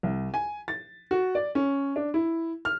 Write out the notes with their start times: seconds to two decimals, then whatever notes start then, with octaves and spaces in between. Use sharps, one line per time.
0.03 C2
0.34 G#5
0.68 A6
1.11 F#4
1.35 D5
1.55 C#4
1.96 D4
2.14 E4
2.65 F6